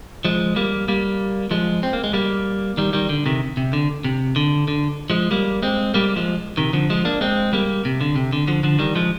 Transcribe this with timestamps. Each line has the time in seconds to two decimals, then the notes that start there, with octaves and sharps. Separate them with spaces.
0.25 F3 G#3
0.56 G3 A#3
0.88 G3 A#3
1.51 F3 G#3
1.83 C4
1.93 A#3
2.04 G#3
2.13 G3 A#3
2.77 D#3 G3
2.93 D#3 G3
3.09 D3
3.26 C3 D#3
3.57 C3
3.73 D3
4.04 C3
4.36 D3
4.68 D3
5.10 F3 G#3
5.31 G3 A#3
5.63 G#3 C4
5.94 G3 A#3
6.16 F3 G#3
6.57 C3 D#3
6.73 D3 F3
6.90 F3 G#3
7.05 A#3 D4
7.21 G#3 C4
7.53 G3 A#3
7.85 C3
8.01 D3
8.16 C3
8.33 D3
8.48 D3 F3
8.63 D3 F3
8.79 D#3 G3
8.95 F3 G#3